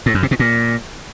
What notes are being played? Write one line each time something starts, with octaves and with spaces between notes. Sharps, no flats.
A2
F#2
C3
B2
A#2